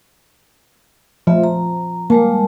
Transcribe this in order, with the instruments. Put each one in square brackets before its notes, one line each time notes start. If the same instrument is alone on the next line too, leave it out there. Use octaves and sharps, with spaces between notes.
[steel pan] F3 [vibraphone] A3 F4 E5
[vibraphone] A#5
[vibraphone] G3 G#3 A5 [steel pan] A#3